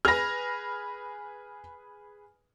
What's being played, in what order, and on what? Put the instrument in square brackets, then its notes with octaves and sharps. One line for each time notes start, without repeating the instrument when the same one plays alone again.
[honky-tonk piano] G#4 B4 [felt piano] F6 A#6